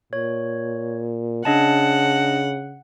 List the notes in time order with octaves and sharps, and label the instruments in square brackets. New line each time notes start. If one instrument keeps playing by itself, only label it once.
[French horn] A#2 [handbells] C#5
[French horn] C#3 [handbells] D4 D#5 A5 [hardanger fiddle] F#5